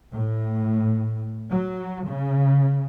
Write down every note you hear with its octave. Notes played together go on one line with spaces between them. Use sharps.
A2
F#3
C#3